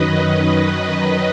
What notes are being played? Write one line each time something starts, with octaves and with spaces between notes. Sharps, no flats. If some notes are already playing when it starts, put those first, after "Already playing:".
Already playing: F#2 D#3 F#3 B4 D#5